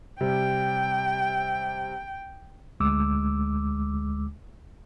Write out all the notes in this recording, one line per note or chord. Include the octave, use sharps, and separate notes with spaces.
C3 G3 G5
D2 G#3 D6 E6